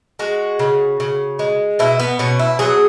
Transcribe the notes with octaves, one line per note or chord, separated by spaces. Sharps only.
G#3 F#4
C#3
C#3
G#3
B2 E4
B3
B2 C#4
E4
F#3 G#4